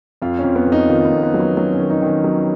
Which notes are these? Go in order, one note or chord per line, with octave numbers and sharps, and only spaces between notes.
F2 F4
C#4
F2
B3
F2
D#4
D#3 F4
B3
F2
B3
F#3
B3
F#3 C#4
C#4
D#3
D#4
D#3 C#4
F#3